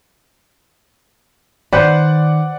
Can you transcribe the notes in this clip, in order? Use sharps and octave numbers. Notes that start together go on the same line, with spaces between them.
D#3 B4 C5 D5 F#5 F#6